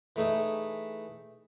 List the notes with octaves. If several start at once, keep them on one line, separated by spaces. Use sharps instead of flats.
E3 A3 D#4 E4 G#4